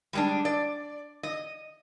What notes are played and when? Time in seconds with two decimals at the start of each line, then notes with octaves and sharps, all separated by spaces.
0.13 G3 G#3 D4
0.45 D5
1.23 D#5